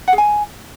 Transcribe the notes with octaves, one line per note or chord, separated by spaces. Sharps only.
F#5
G#4
G#5